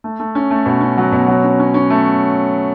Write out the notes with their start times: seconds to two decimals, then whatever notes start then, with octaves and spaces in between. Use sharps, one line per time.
0.04 A3
0.20 A3
0.35 C#4
0.51 A3
0.66 B2
0.81 C#4
0.97 F#3
1.12 B2
1.28 F#3
1.43 C#4
1.60 C#4
1.74 C#4
1.90 A3